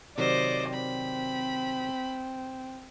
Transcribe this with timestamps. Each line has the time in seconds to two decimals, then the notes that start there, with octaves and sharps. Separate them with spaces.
0.18 C3 D#3 F#3 C5 D5 D#5
0.74 C4 B5